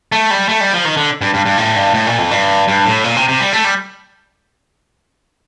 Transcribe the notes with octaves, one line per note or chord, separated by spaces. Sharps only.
A3
G3
A3
G3
F3
D#3
D3
G2
G2
G2
A2
G2
A2
A#2
F2
G2
G2
A2
A#2
C3
C3
G3
A3
G3